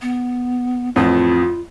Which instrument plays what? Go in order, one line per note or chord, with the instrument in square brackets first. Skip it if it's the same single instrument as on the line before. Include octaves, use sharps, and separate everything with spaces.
[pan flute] B3
[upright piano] A1 F2 [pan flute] F4